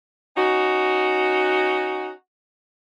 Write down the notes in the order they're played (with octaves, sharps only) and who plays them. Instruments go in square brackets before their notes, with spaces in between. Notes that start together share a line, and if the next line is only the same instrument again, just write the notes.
[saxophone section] C#4 D#4 F#4